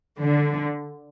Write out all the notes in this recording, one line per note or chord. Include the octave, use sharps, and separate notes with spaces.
D3